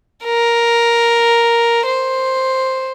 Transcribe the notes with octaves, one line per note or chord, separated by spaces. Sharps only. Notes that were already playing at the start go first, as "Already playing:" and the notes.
A#4
C5